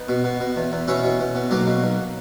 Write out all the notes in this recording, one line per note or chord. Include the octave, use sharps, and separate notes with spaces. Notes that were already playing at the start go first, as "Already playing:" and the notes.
Already playing: B3 D#4
B2
B2
B2
E2
E2
B2 C#4 E4
B2
B2
B2
B1 F#3 A#3
B2
B1